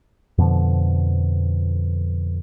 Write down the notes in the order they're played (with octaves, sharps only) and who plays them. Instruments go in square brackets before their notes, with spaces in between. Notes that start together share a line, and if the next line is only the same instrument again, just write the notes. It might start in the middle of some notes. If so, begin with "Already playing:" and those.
[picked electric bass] F2 B2 D3 F3